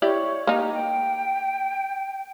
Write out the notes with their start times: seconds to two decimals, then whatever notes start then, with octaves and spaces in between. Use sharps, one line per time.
0.02 E4 G4 C#5 D5
0.47 A#3 D#4 G4
0.73 G5